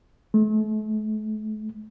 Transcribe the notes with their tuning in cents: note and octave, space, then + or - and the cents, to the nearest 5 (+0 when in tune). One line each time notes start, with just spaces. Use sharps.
A3 -40